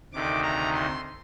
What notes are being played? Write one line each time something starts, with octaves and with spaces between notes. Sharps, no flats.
D2 C3 D#3 D6
A#5
C6